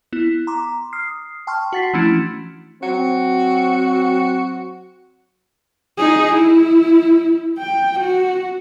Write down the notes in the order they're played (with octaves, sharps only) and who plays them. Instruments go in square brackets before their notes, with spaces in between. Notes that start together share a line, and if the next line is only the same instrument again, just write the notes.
[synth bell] B3 E4
A#5 C6 D6
D#6 F6 C7
G5 A5 C6 C#6 F6
F#4 F#5 A6 B6 C7
E3 F3 A3 C#4 D4 E4
[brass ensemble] F#3 C4 [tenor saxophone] F#4
[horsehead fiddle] D#4 G#4
E4
G5
F#4